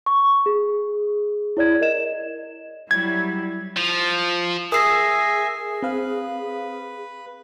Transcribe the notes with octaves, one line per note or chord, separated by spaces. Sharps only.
C#6
G#4
E4 C#5 D5 G#6
A#4 D#5 E7
F#3 G3 E4 G#6
F3
G#4 A#4 E5 G#5 D#6 E6 A#6 C7
C4 B4 F5